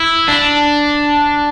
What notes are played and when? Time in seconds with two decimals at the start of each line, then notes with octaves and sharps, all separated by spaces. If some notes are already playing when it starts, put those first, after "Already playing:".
Already playing: E4
0.28 D4